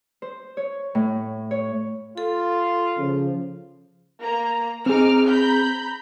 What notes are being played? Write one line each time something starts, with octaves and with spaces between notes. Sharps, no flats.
C5
C#5
A2
C#5
F4 A4
C#3 F3
A#3 A#5
C4 D#4 G#4 D6 F6
A#5 B5 G6